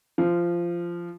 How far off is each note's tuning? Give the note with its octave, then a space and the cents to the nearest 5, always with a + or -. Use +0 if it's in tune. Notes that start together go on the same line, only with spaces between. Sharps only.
F3 -15